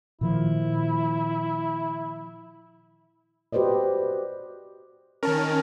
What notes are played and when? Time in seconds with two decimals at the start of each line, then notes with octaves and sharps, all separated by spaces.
0.21 A#2 D#3 F3 E4
3.53 F#4 G4 B4 C5 D5 D#5
5.23 D#3 C#4 A#4 A5